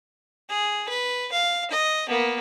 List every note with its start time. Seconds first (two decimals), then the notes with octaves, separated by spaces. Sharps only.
0.49 G#4
0.88 B4
1.32 F5
1.71 D#5
2.08 A#3 B3